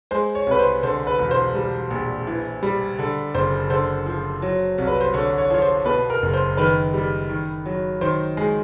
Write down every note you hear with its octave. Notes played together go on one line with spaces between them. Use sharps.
G#3 C5
C#5
C2 B4
C5
D3 C5
B4
E1
C5
G3
A#1
E3
G3
D3
F#1 C5
D3 C5
F3
F#3
C2
B4
C5
D3 C#5
C#5
F3 C#5
C5
B2 B4
A#4
F#1
C5
D#3 B4
G3
D#3
F#3
D#3 C5
G#3